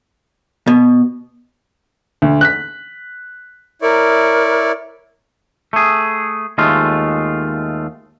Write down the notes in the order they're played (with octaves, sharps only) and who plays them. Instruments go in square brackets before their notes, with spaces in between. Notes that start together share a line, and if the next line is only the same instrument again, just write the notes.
[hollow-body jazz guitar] B2
[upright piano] D2
F#6 B6
[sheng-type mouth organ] E4 C#5 D5 [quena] A#4
[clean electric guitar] A3 G#4
D#2 G#3 A3 F4